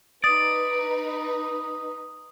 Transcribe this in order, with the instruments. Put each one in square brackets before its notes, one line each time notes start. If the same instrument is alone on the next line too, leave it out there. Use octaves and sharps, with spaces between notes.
[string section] D#4 B4 [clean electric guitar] D5 [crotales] D#6